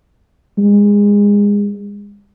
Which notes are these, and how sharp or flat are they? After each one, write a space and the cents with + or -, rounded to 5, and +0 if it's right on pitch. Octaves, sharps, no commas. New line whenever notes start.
G#3 -25